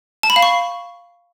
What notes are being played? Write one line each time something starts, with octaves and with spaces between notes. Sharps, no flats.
A5
B5
F5
C#6